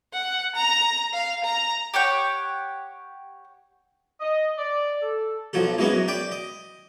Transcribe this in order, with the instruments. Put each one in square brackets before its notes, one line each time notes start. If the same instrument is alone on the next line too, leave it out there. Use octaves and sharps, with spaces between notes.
[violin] F#5
A#5
F5
A#5
[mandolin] G4 C#5 F#5 G5
[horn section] D#5
D5
A4
[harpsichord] B1 F3 F#3 A4
E3 F#3 G#3 B3 C#4
F#2
D5 G5 B5 D6
D#5